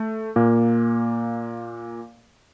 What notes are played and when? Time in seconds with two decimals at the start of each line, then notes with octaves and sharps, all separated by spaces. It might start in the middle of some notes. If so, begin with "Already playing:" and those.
Already playing: A3
0.36 A#2 A#3